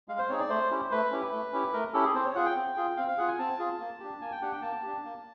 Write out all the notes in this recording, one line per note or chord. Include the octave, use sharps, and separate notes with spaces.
G#3 F5
C5
C4 D#4 G#4 C#5
D5
A3 C5
C#4 E4 G4
A3 B4
C#4 E4 G4
A3
C#4 E4 G4
A3 A#4
C#4 E4 G4 A4
G#4
C4 C5
C#5
F4 G#4 F#5
G5
C4
F4 G#4
C4 F5
F5
F4 G#4 F#5
G#5
C4 A5
F4 G#4
A#3
D4 G4
A#3 G#5
G5
D4 G4 F#5
G5
A#3 A5
D4 G4
A#3